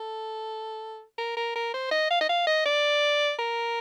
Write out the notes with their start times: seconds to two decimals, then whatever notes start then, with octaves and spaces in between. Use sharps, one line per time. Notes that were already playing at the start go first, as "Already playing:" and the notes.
Already playing: A4
1.18 A#4
1.37 A#4
1.56 A#4
1.74 C5
1.91 D#5
2.11 F5
2.21 D#5
2.29 F5
2.47 D#5
2.66 D5
3.39 A#4